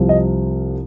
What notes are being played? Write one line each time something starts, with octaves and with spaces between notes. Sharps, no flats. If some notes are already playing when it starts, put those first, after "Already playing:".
Already playing: C2 C3 F3
D#5